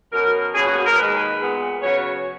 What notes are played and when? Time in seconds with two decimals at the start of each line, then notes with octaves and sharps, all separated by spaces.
0.12 B2 F#3 C#4 A#4
0.54 B2 A#3 C#4 G#4
0.65 F#4
0.75 G#4
0.86 A#4
0.96 D#2 D#3 G#3 B4
1.39 A#2 G#3 B3
1.81 C#3 F#3 B3 C#5